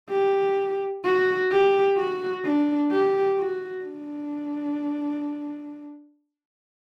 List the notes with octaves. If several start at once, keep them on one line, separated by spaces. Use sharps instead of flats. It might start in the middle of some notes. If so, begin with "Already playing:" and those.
G4
F#4
G4
F#4
D4
G4
F#4
D4